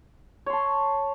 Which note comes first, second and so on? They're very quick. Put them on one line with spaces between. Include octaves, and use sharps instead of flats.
C#5 C6 A5